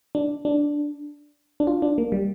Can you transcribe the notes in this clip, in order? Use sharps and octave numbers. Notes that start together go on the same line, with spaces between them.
D4
D4
D4
F4
D4
A#3
G3